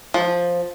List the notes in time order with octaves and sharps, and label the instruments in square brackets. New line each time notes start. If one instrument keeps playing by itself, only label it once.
[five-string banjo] F3